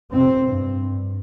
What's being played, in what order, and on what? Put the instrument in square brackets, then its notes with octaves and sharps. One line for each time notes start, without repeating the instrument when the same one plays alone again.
[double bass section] F2 C3 C4
G2
G2